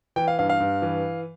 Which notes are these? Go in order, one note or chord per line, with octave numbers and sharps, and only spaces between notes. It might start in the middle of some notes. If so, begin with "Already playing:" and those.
E3 G5
F5
G2 F5
F5
G2
E3